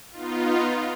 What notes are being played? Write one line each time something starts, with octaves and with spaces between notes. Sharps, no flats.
B3 D#4 F4